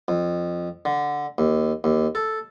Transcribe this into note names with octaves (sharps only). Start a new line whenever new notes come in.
F2
D3
D#2
D#2
A4